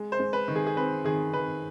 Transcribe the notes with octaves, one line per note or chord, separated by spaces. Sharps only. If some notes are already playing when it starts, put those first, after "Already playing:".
Already playing: G#3
C5
G#3
B4
D#3
G#4
G#4
C4 B4
D#3 G#4
D#3 B4